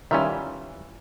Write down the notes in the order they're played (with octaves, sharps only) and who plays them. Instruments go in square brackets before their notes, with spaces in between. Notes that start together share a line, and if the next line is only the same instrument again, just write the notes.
[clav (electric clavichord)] D#3 G3 C#4 [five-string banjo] E3 F4 E5